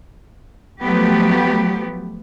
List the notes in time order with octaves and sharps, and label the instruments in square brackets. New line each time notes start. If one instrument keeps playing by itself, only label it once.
[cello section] F3 F#3 A3 B3 G4